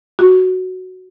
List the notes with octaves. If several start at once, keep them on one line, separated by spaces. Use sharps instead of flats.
F#4